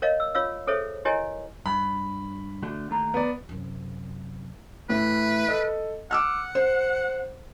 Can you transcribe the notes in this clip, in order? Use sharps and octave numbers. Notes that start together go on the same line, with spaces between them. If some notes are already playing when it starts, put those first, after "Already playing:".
A#4 C#5 D#5 F5
E6
F4 C#5 F5 E6
G#4 A4 C5 C#5 E5
E4 G4 A#4 C#5 D#5 G#5
G2 B5
D3 A3 F#4
D#2 A3 A#5
B3 D5
F#2 C3
A2 E3 B4
A4 D#5
F#5 D6 E6 F6
C5